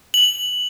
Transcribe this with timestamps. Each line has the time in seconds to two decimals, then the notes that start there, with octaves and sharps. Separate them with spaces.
0.14 F#7